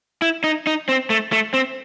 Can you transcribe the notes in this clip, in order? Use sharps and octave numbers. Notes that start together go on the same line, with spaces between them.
E4
D#4
D#4
C4
A3
A3
C4